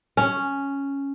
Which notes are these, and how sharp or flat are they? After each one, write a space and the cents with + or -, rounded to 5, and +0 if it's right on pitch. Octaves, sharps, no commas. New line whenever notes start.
C#4 +0